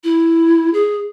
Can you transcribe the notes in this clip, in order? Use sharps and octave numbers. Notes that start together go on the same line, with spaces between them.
E4
G#4